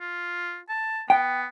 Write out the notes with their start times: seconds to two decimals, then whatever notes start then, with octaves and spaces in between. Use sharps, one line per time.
0.01 F4
0.69 A5
1.10 B3 G5